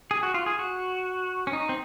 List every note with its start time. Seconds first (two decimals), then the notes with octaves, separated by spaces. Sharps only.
0.11 G#4
0.23 F#4
0.34 F4
0.46 G#4
0.59 F#4
1.47 C#4
1.53 D#4
1.69 C4